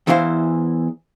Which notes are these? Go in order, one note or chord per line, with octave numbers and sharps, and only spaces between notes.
E2 E3 E4 C5 F5